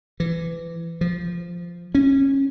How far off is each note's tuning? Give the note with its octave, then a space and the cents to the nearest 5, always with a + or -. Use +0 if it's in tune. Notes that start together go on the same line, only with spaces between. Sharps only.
E3 +25
F3 -10
C#4 -20